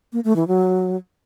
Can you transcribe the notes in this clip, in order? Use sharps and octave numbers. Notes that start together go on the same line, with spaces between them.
A#3
A3
E3
F#3